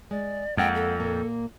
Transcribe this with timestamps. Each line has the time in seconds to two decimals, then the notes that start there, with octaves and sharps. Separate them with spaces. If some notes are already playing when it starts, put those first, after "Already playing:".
0.11 G#3 D5
0.57 F2 G#3 A#3 F#5 G5
0.75 A4
1.00 A#2 A#3